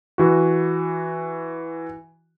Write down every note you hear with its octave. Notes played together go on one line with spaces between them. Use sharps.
E3 F#4